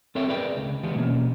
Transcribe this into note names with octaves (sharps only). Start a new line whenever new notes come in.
C4 A4 A#4 C#5 E5 G5
G#4 A#4 B4 D5 F5 G5
C#2
E3 G#3 B3 G4
B2 A#3 C#4